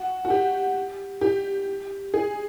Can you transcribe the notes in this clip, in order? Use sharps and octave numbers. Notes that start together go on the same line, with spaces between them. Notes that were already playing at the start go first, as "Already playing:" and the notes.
Already playing: F#4
F#4
G4
G4
G#4